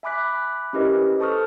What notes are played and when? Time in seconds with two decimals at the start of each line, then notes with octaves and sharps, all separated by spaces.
0.03 E5 G#5 B5 D6 F#6 B6
0.73 C#4 E4 G4 A#4 B4 D#5
1.19 A4 C5 A5 C#6 D#6 F6